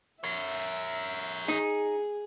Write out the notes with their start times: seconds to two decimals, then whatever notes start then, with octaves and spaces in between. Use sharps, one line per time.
0.24 A#4 C#5 E5
1.48 D#4 G#4